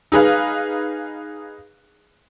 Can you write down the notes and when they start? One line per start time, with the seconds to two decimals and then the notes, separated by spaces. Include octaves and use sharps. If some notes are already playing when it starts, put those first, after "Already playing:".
0.12 D#4 G#4 B4 F5